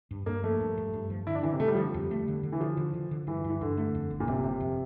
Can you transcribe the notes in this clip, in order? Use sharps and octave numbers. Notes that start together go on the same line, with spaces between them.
G2
G2 A#3
F3 A3
G2
G2
G2
F3
D3 E4
D4
D3 E3
C3
D3 A3
G3
D3 F3
G3
F2
A3
D3
D3
E3
D3 F3
D3
D3
D3
G2 E3
G2
E3
G2 D3
A3
F2
G1
A#2
G1 C3
G1 C3
F2